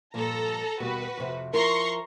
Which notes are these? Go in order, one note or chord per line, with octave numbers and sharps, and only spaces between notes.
G2 A#2 F3 A4 A#5
D#2 B2 G3 F#4 B4
F2 C3
F3 E4 A#4 A#5 C6 C#6